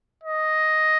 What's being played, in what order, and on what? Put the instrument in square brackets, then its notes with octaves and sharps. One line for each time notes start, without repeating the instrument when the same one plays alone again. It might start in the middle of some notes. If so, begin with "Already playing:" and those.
[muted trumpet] D#5